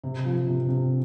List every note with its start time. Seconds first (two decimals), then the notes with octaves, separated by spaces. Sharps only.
0.04 C3
0.25 F3
0.47 C3
0.69 C3